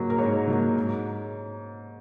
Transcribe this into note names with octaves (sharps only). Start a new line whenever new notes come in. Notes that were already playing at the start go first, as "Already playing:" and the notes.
Already playing: G#2 F#3 A#3
A#4
G#2 C#5
F#3 A#3
G#2